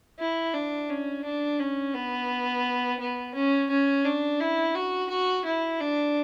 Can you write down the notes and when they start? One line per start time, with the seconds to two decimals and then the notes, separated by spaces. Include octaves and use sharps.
0.19 E4
0.54 D4
0.89 C#4
1.24 D4
1.60 C#4
1.94 B3
3.00 B3
3.35 C#4
3.70 C#4
4.05 D4
4.40 E4
4.75 F#4
5.10 F#4
5.45 E4
5.80 D4